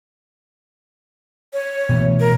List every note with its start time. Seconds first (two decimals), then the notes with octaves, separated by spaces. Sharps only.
1.53 C#5
1.89 B2 E3 A3
2.20 A#4